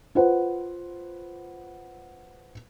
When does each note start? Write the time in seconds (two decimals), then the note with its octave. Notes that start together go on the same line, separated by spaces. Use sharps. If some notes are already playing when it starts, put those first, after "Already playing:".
0.15 F4 B4 C5 F#5